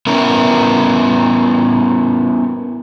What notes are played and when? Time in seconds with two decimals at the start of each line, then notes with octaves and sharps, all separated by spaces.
0.07 B3 C#4 E4 A#4